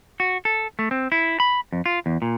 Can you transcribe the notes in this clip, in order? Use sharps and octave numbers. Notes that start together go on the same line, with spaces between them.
F#4
A4
A3
C4
E4
B5
F2
F4
E2
A#2